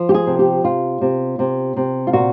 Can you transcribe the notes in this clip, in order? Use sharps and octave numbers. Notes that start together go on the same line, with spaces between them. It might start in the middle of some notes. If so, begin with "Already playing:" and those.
Already playing: F3
G4
G#4
C3
G4
C3 F4
C3
C3
C3
F4
A#2 F#4